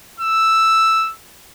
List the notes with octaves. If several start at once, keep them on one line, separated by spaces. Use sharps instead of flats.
E6